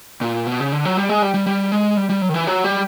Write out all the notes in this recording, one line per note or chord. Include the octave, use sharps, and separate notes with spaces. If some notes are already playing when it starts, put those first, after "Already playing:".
A#2
B2
C#3
D3
F#3
G3
G#3
G3
G3
G3
G#3
G3
G3
F#3
D#3
E3
F#3
G3